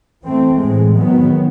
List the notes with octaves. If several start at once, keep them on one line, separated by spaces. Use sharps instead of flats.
E3 A3 C4
A2 E3 G#3
D#3 F#3 B3